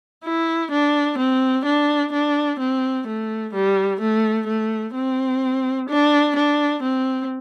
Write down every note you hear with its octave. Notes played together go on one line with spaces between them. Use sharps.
E4
D4
C4
D4
D4
C4
A3
G3
A3
A3
C4
D4
D4
C4